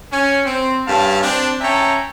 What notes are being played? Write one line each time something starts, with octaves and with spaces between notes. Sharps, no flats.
C#4
C4
G2 C#4 F5 A5
C4 D4
C#4 E5 G5 A5 A#5